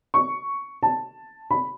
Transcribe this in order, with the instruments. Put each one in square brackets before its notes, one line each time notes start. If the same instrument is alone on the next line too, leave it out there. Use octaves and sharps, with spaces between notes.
[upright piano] C#6
A5
B5